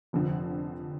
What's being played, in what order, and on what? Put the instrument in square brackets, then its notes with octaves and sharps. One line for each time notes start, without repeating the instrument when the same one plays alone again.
[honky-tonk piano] F1 F2 D3 F3